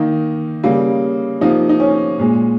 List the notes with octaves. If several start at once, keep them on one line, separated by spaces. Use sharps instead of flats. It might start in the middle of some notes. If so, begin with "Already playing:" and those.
Already playing: D#3 A#3 D#4
C#3 G3 A#3
C3 F3 A#3 D#4
D#4
C#4
A#2 G#3